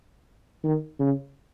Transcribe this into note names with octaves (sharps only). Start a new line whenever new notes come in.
D#3
C#3